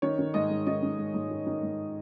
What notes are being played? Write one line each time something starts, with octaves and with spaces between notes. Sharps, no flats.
D#3 C#5
D#3
G#2 D#5
G#2
D#3 D#5
D#3
G#2
G#2
D#3
D#3
G#2